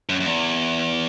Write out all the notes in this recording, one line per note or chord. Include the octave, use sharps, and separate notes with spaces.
F#2
F#2
E2